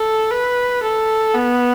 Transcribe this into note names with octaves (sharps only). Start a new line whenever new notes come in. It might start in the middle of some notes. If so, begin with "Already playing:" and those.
Already playing: A4
B4
A4
B3